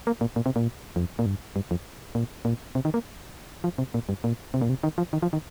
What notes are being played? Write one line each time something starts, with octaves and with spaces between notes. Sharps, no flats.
A#3
A#2
A#2
C3
A#2
F2
A#2
G2
G2
F2
A#2
A#2
C3
D#3
A#3
F3
C3
A#2
G2
A#2
C3
A#2
C3
D#3
F3
D#3
F3
D#3